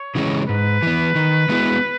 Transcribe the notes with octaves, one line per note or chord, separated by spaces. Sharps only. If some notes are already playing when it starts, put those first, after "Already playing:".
Already playing: C#5
C#3 E3 G#3 C#4
G#2 B4
E3 B3
D#3
G#3 B3 E4 G#4